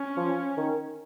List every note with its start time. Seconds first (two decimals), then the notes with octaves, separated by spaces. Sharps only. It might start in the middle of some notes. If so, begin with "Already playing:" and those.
Already playing: C#4
0.17 F3
0.57 D#3